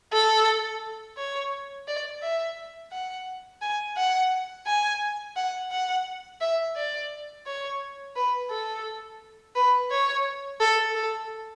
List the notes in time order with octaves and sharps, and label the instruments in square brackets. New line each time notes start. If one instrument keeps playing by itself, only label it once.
[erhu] A4
C#5
D5
E5
F#5
G#5
F#5
G#5
F#5
F#5
E5
D5
C#5
B4
A4
B4
C#5
A4
A4